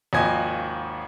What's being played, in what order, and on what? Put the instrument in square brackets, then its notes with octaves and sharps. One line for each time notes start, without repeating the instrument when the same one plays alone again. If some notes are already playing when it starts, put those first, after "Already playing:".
[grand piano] G#1 D#2 F3 D#5 G#5 G#6